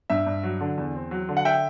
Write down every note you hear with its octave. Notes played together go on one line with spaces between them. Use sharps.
G2 E5
G2
F#3
D3
E2
C4
F#3
D3
F#5
E5 G5